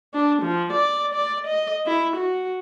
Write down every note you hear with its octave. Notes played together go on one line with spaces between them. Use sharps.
D4
F3
D5
D5
D#5
E4
F#4